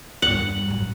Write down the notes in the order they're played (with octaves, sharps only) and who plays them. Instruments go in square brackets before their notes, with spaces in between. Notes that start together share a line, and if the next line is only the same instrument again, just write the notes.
[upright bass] E2 G2 [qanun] F#5
[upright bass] A1 F#2